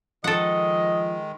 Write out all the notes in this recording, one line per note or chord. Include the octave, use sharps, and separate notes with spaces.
D#3 F3 G#3 A4 D#5 F#5